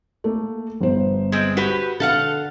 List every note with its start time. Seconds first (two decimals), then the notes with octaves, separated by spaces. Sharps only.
0.24 A3 A#3
0.81 G1 B3 C5
1.32 G#3 C4
1.57 F#4 G4 B4
2.00 D3 A4 F5 F#5